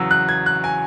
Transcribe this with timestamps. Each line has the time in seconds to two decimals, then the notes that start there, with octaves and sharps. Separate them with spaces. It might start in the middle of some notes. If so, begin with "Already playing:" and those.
Already playing: E2 C#3 F#3 E6
0.11 F#6
0.29 G#6
0.46 F#6
0.64 G#5